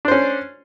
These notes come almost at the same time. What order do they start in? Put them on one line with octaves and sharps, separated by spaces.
D4 C5 C#4